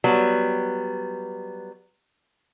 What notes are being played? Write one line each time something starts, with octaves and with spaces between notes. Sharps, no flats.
F#3 G3 B3